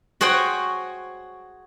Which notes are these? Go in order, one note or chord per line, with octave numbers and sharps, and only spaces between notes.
F#4 G#4 C5 C#5 G5 G#5